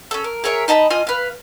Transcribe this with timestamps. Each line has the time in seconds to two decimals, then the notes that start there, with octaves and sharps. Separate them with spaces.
0.11 C#4 A4
0.24 A#4
0.44 G#4 A#4 C#5 E5
0.68 D#4 D#5 A5 B5
0.90 F4 D#5 G#5 F6
1.07 B4 F5